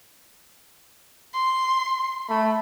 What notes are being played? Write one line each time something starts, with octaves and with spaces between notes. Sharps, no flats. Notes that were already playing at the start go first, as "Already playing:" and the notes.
C6
A3 B5